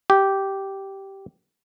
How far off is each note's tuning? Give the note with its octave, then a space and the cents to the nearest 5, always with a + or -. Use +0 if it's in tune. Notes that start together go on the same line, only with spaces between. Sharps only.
G4 -10